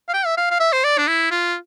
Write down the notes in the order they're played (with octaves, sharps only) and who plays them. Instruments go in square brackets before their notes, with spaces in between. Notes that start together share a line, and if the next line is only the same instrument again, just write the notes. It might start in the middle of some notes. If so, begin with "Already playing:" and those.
[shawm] F5
G5
E5
F5
F5
E5
C5
D5
D4
E4
F4